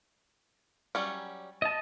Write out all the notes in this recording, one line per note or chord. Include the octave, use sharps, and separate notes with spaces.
F#3 G3 C#4
D#5 A5